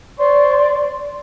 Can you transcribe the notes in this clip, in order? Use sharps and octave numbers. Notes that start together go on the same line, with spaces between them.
C5 D5 C6 C#6